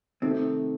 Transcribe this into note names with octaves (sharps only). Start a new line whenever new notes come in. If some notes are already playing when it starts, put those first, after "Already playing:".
C3 D#3 A3 C4 D#4